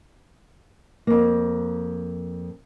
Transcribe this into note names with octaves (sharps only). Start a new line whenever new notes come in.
F2 A#3